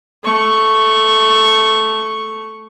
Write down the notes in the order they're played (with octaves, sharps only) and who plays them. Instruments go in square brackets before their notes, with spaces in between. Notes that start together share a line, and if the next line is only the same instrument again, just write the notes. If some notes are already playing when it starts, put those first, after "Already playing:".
[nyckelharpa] A3 C#6